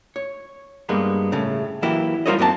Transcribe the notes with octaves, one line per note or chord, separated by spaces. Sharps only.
C#5
G2 G3 G#3 A#3 B3
A2 C#3 A3
E3 F#3 A#3 E4 G4
G3 F4 A#4 C5 C#5 D#5
F#2 A#3 C4 E4 A5